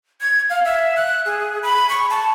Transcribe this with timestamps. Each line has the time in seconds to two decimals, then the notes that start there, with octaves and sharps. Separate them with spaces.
0.21 G#6
0.50 F5
0.65 E5
0.96 F#6
1.25 G#4
1.63 B5
1.89 C#6
2.10 A5